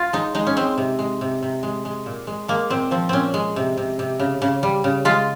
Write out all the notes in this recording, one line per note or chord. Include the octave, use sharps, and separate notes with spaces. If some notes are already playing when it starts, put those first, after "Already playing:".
Already playing: F4
G#3 D#4
G#3 D#4
C#4
G#3 C4
C3
G#3
C3
C3
G#3
G#3
A#2
G#3
G#3 A#3
A#2 C4
F3 C4
A#2 C4 C#4
G#3
C3
C3
C3
C#3
C#3
G3
C#3
G#3 F4